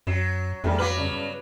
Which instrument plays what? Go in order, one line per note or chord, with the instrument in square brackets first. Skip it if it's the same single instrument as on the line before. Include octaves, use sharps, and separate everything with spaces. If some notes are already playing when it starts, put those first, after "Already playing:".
[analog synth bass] F#2 [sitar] F#3 [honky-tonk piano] C7 E7
[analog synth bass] F2 [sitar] G#2 D#3 [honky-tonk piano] G3 A3 D4
[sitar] F#3 B3 B4 [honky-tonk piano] F5 D6 F#7
[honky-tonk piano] G2 C#3